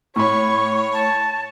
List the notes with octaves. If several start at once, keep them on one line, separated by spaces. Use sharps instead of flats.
A2 C#5 B5 C#6
A5